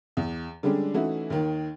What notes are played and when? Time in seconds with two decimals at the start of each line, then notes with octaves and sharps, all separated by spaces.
0.17 E2
0.63 D3 G3 G#3 C#4 D4
0.94 E3 A3 C#4 D#4 E4 F#4
1.30 D#2 D#3